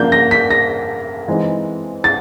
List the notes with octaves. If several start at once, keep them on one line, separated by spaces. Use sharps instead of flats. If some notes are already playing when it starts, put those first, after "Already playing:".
Already playing: C#3 F3 A#3 D4 G6
A#6
B6
A#6
E3 G#3 C4 D#4
A6